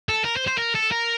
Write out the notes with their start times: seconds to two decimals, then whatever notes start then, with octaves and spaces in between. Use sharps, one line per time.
0.09 A4
0.24 A#4
0.36 C5
0.47 C5
0.58 A#4
0.75 A4
0.91 A#4